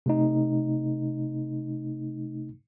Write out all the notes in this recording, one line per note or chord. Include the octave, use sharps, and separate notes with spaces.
C3 A3 D#4